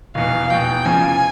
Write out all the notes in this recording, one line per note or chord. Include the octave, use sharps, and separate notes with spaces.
F1 E2 B2 F5
F1 E2 B2 G5
F1 E2 C#3 F3 G#5